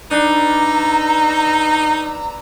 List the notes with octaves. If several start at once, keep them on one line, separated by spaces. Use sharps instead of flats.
D4 D#4 B4 A#5 E6